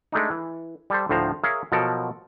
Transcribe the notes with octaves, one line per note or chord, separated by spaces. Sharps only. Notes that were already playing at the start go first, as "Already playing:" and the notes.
G#3 A3 D4 D#4
E3
G3 A4 C5
D2 A2 F3 C5 A#5
G#4 A#4 C#5 E5 F5
B2 F3 F#3 A4 A#4